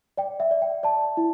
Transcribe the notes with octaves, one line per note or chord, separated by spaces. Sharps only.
D5 G5
E5
D5
G5
D5 A5
E4